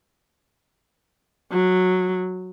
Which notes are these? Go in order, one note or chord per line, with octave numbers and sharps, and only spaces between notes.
F#3